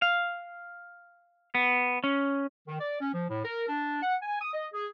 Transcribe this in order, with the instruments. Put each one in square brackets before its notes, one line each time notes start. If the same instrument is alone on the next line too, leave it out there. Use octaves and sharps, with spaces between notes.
[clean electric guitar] F5
B3
C#4
[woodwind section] D#3
D5
C#4
F3
A2
A#4
D4
F#5
G#5
D#6
D#5
G#4